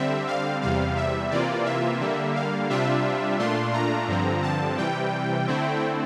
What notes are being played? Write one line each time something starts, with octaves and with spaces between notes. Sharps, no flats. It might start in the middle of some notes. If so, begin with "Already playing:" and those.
Already playing: D3 G3 C4 E5
F5
E2 C3 G3 F5
E5
C3 E3 A#3 F4 D5
E5
D3 G3 A#3
F5
C3 G3 D4 F4 E5
A#2 A3 D4 F4 C6
A#5
G2 D3 F3 C4
A5
C3 E3 G3 G5
D3 A3 C4 E4